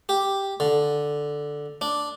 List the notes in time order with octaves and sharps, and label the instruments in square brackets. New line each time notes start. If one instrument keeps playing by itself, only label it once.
[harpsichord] G4
D3
D4